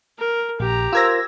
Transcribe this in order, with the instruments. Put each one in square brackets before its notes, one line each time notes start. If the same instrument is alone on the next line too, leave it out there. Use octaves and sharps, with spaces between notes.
[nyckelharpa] A#4
[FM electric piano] A#1 [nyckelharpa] G4 A#5
[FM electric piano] F4 A#4 C5 [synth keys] E6 G#6 A#6